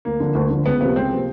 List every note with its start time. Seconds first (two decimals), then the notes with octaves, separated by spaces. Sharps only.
0.05 D2 A#3
0.20 D3 F3
0.35 D2
0.50 D3 F3
0.66 C#2 B3
0.80 C3 F3 A#3 B3
0.96 C#2 C4
1.11 C3 F3 A#3